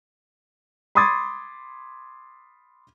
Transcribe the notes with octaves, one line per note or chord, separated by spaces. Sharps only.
B5 C6 D6 D#6 G#6 A6